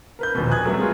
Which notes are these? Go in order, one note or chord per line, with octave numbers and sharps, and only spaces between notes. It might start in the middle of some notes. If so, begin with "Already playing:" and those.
A#4 B4 G6
A#1 D#2 B2
G#5 D#6 F#6 G#6
F#3 G3 A3 B3 C4
G#3 B3 F4 G#4